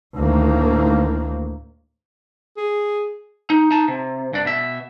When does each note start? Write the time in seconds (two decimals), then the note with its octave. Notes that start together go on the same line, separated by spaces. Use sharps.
0.17 D2 A2 D#3 A#3
2.57 G#4
3.50 D#4
3.71 D#4 A5
3.88 C3
4.33 G2 D4
4.45 B2 E5